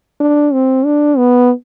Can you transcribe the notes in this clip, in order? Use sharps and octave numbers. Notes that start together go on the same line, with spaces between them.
D4
C4
D4
B3